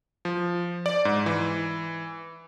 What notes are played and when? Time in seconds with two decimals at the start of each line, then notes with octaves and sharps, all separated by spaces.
0.25 F3
0.86 D5
1.05 G#2
1.26 E3